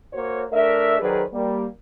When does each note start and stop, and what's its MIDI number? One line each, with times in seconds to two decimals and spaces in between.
0.13 0.43 58
0.13 0.43 66
0.13 0.43 72
0.13 0.43 73
0.52 0.97 57
0.52 0.97 62
0.52 0.97 70
0.52 0.97 76
0.99 1.22 51
0.99 1.22 54
0.99 1.22 68
0.99 1.22 71
0.99 1.22 72
0.99 1.22 74
1.33 1.66 55
1.33 1.66 58